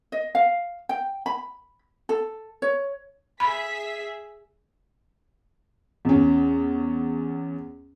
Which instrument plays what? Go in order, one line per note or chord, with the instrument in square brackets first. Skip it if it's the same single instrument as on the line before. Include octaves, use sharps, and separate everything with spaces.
[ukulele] D#5
F5
G5
B5
A4
C#5
[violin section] G#4 E5 B6 [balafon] B5
[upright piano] E2 C#4